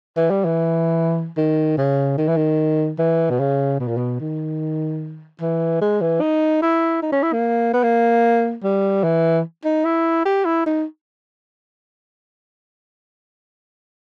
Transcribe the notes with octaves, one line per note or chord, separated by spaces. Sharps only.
E3
G3
E3
D#3
C#3
D#3
E3
D#3
E3
B2
C#3
B2
A#2
B2
D#3
E3
G#3
E3
D#4
E4
D#4
C#4
E4
A#3
B3
A#3
G3
E3
D#4
E4
G4
E4
D#4